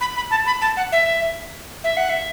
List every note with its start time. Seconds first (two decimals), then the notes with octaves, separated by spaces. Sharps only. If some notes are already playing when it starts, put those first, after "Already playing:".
0.01 B5
0.16 B5
0.31 A5
0.46 B5
0.61 A5
0.77 F#5
0.92 E5
1.84 E5
1.97 F#5
2.10 E5